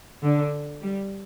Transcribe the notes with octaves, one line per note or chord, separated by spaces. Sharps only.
D3
G3